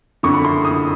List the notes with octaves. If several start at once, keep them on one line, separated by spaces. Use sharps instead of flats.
F#1 F2 D3 C#6
B5
C6
D#6